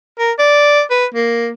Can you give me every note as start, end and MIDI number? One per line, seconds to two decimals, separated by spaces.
0.19 0.32 70
0.39 0.83 74
0.90 1.06 71
1.14 1.51 58